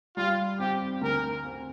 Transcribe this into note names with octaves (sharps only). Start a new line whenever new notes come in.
G3 F4
C4 G4
D2 A#4
C4